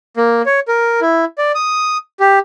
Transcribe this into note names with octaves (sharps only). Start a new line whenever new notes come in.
A#3
C#5
A#4
E4
D5
D#6
G4